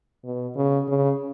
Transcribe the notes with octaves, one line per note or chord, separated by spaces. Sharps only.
B2
C#3
C#3